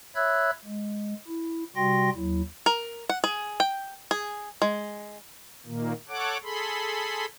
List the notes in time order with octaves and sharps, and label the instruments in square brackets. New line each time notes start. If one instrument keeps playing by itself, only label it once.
[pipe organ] C#5 E5 B5 E6 F#6 G#6
G#3
E4
C3 G3 F#4 G5 C6 A#6
D#2 F#3 E4
[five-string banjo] A#4
F#5
G#4
G5
G#4
G#3
[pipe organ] A#2 D#3 A#3
A4 C#5 F#5 D6
G#4 A4 B5 C6